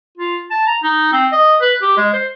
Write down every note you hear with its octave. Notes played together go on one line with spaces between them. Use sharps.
F4
A5
A#5
D#4
C4
D#5
B4
G4
G#3
C5